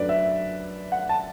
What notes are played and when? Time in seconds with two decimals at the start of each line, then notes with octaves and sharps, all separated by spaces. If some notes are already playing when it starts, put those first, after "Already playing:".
Already playing: F#2 F#3 A3 D4 B4 D5
0.09 E5
0.92 F#5
1.09 A5